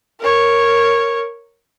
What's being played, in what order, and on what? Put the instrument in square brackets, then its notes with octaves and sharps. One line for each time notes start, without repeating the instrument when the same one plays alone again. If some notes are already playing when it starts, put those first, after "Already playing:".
[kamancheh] A#4 C#5